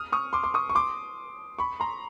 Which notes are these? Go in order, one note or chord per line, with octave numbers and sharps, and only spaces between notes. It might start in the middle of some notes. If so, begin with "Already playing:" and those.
Already playing: D#6 F6
C#6 D#6
C6 D6
C6 D6
C#6 D#6
C#6
C6 D6
B5 C#6
A#5 C6